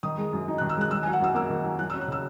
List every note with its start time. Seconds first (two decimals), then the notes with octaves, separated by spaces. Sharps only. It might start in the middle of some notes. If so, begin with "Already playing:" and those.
0.03 D#3 D#6
0.18 G#3
0.33 F#2
0.48 D#4
0.58 F#6
0.62 D#3
0.69 E6
0.77 G#3 F#6
0.91 D#3 E6
1.03 G#5
1.06 F#3
1.13 F#5
1.21 F#2 E6
1.35 A#3 E6
1.50 D#3
1.64 F#3
1.79 F#3 F#6
1.90 E6
1.94 C#4
2.01 F#6
2.08 C#3 E6